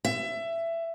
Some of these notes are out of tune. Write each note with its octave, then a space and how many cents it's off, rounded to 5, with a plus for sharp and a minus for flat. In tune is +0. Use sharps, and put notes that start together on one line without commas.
E5 +20